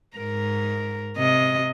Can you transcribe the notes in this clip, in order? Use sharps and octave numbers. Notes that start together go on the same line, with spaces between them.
G#2 A#4
C3 D#5